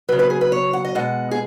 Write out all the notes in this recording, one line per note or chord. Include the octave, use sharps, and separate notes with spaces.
C#3 F#3 B4
B4
G#4
B4
C#5
F#5
D#5
B2 G#3 F#5
G#4